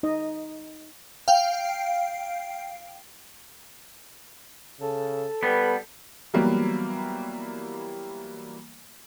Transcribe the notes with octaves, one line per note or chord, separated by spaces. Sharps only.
D#4 D#5
F5 G5
C#3 A4
G3 B3 B4
E3 F#3 G3 A#3 B3